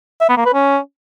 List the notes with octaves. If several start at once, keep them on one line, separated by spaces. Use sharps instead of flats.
E5
B3
A#3
B4
C#4